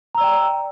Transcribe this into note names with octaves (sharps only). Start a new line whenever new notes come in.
D5 G5 A#5 E6